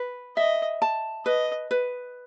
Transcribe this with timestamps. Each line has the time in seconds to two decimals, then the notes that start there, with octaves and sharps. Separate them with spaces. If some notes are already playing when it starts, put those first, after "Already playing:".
Already playing: B4
0.37 D#5 E5
0.82 A5
1.26 B4 D#5
1.71 B4